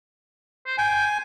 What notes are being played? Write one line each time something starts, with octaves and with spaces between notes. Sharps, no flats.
C5
G5 G#5